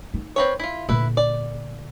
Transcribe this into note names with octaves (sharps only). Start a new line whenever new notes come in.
D#4
C4 B4 C#5
E4 F4
A#2 D3 E4 B4
D5